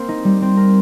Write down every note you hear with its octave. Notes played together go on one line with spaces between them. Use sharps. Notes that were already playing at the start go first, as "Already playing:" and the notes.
Already playing: A#3 C4
D#4
G3
C4
A#4